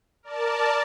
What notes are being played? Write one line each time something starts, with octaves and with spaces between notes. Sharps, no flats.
A#4 D5 A5